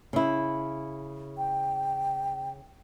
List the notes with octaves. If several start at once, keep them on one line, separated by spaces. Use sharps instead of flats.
C#3 E4
G5